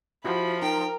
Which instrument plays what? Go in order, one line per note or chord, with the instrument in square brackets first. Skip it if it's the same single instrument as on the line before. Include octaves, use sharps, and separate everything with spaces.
[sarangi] F3 [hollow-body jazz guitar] E4 F#4 G4 [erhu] B5
[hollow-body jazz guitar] D#4 [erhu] A#4 [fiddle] G5